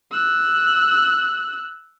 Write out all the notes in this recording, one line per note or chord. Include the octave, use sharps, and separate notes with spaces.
E6 F#6